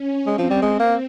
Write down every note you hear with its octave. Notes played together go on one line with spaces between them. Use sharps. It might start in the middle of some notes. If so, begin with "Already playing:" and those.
Already playing: C#4
G#3 C4
F3
G3
G#3
A#3